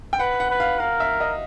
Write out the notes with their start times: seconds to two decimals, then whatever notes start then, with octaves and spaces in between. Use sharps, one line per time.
0.13 G5
0.20 B4 F#5
0.40 F#5
0.50 B4
0.60 F5
0.79 A#4 F5
1.00 E5
1.20 D#5